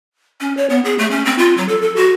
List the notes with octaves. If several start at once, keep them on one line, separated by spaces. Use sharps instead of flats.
C#4
C#5
B3
G#4
A3
C#4
C4
F4
F#3
A4
A4
F#4